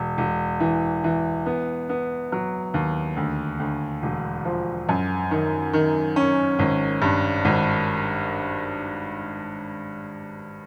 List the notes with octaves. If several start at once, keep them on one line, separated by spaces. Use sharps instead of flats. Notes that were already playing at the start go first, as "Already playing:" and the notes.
Already playing: E1
E1
E3
E3
B3
B3
F#3
D#2
D2
D2
E1
F3
F#2
D#3
D#3
C#4
G#1
G2
G#1